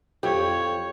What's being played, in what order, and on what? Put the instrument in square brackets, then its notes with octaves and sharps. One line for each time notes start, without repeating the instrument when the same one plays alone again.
[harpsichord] F2 [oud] G4 [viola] C#5